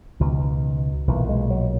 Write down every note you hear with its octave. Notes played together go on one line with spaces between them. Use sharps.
C#2 B2 D#3
B1 A#2 E3
G#3
F#3